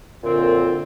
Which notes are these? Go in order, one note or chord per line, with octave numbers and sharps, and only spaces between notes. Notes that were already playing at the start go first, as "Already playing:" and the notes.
F#2 A#2 D3 C4 F4